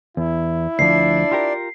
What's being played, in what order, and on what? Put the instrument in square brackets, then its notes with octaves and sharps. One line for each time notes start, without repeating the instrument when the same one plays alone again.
[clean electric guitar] E2 [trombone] E4
[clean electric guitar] D2 F3 [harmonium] D4 D5 [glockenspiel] C7
[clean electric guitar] F4 G4 A#4